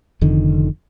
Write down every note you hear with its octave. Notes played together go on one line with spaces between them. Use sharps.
F1 F2 D3 D#3